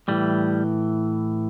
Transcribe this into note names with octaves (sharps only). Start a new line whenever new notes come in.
A2 E3 G3